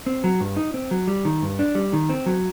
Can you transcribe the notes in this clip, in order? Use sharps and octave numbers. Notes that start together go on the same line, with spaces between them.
C4
F#3
G2
D#4
C4
F#3
G3
D#3
G2
D4
G3
D#3
C4
F#3